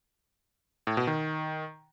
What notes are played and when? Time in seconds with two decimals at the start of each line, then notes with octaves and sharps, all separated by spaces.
0.87 A2
0.97 B2
1.07 D#3